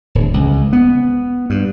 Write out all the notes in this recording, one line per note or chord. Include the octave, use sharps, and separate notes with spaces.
D1
C#2
B3
G2